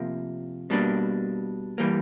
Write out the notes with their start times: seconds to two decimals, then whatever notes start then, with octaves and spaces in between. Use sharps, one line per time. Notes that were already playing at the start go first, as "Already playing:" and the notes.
Already playing: C3 F3 A#3
0.70 B2 G3 A#3 D4
1.78 E3 G3 A#3